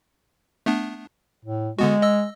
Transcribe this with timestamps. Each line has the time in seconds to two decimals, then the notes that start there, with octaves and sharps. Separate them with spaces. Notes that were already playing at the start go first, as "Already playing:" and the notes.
0.66 A3 B3 D4
1.45 A2
1.79 D3 G#3 B3 F#4
2.02 D#5 E6